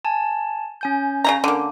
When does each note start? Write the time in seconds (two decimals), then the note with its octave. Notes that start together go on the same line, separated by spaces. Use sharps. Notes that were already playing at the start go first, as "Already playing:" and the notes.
0.05 G#5 A5
0.81 C#4 G#5 G6
1.24 C#3 E4 A#5
1.44 D3 A#3